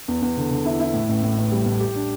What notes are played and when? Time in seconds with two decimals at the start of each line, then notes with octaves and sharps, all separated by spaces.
0.08 E2
0.22 E2
0.37 D3
0.51 D3
0.66 E4
0.80 E4
0.94 A2
1.09 A1
1.23 A2
1.38 A1
1.52 G3
1.66 A2
1.80 G4
1.95 D4